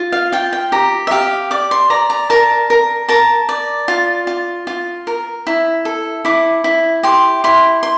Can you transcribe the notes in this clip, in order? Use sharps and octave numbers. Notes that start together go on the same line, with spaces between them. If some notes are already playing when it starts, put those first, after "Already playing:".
Already playing: F4
F5
F4 G5
G5
G4 A#5
E5
G4 F5
D5 D6
C6
D5 A#5
A#5
A#4 A5
A#4
A#4 A5
D5
F4
F4
F4
A#4
E4
A4
E4 D6
E4
G4 C6
E4 C6
C6